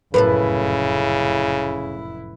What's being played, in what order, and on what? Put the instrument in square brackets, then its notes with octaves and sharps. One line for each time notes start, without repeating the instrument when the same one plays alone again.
[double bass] F1 E4 [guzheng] F#2 A2 A4 [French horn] C#3 [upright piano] B4